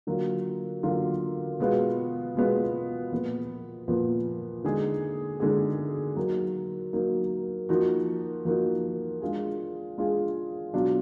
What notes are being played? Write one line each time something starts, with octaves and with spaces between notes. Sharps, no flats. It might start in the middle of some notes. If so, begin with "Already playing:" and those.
D3 F#3 A#3 F4
D3 F#3 A#3 F4
B2 G#3 B3 F4
B2 G#3 B3 F4
A#2 F3 B3
A#2 F3 B3
D3 G#3 D#4 G#4
D3 G#3 D#4 G#4
F#3 A#3 D#4
F#3 A#3 D#4
F3 A#3 D#4 F#4
F3 A#3 D#4 F#4
G#3 D4 F4 G#4
G#3 D4 F4 G#4
B2 F#3 D4 F4